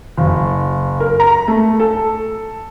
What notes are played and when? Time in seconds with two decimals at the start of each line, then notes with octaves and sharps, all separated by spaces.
0.17 F#1
1.00 A#4
1.20 A#5
1.48 A3
1.80 A4